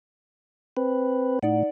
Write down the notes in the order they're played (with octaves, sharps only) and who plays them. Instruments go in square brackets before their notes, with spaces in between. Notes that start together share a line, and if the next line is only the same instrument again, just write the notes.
[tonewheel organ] C4 B4
[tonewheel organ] A2 [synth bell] D#4 D5 F#5